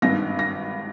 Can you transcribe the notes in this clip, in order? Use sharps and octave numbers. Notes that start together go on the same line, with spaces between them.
G#1 G2 D#3 A#6
A#6